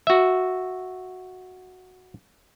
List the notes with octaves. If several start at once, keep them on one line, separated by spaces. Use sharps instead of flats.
F#4 E5